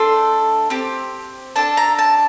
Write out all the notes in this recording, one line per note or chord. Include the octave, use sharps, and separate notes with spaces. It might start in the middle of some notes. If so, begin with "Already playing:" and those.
Already playing: A3 D4 A4 C6
C4 G4
D4 A4 A5
A#5
A5